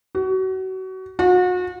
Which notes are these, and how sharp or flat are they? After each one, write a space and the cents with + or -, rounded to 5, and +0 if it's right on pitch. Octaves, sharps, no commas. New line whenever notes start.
F#4 +30
F#4 -35